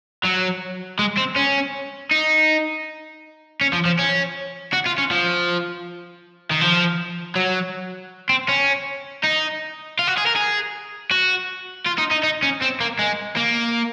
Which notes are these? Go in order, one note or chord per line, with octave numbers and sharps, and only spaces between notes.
F#3
G#3
C4
C#4
D#4
C#4
F3
F3
C#4
F#4
F4
C#4
F3
D#3
F3
F#3
C4
C#4
D#4
F4
F#4
G#4
A#4
G#4
F#4
F4
D#4
D#4
D#4
C#4
C4
A#3
G#3
A#3